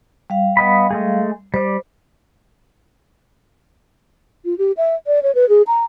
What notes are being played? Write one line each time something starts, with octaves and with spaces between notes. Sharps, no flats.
G3 F5
B3 D#5 B5
G#3 A3 G#4
G3 C5 D5
F4
G4
E5
D5
C#5
B4
G#4
A#5